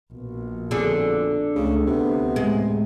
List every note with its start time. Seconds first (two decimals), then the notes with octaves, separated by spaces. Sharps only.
0.13 A#1 B2
0.71 F2 B2 D3 D4 G#4
1.55 C#2 C#3 A3
1.87 D2 C3 B3
2.36 A2 G#3